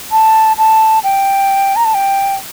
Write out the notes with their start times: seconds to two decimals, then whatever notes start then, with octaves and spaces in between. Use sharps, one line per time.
0.12 A5
0.58 A5
1.04 G5
1.76 A#5
1.85 A5
1.94 G5